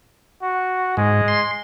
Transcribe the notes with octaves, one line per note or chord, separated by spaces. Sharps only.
F#4
G#2 G#3
C6